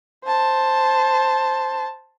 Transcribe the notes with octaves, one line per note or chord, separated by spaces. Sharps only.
C5 A5